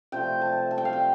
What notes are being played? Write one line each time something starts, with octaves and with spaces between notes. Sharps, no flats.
C3 F3 A3 G5
A5
A5
G5
F5
G5